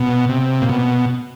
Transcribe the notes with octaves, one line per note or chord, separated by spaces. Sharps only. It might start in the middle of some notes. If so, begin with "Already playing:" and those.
Already playing: B2
C3
A#2
B2